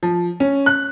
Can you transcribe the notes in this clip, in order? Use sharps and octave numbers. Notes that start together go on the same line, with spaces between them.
F3
C#4
F#6